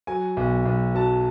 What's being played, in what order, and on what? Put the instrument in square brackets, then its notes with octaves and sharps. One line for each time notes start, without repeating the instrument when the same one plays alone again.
[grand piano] F#3 G#5
B1
B1
F#3 A5